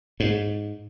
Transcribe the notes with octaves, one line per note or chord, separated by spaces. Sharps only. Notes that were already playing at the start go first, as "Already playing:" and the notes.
G#2